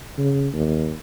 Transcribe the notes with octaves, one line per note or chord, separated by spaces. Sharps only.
C#3
D#2